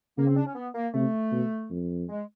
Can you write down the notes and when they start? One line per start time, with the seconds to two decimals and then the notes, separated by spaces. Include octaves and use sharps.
0.18 C#3 A#3
0.27 C4
0.37 D4
0.47 C#4
0.55 B3
0.75 A#3
0.94 C3 A3
1.32 B2
1.70 F2
2.09 G#3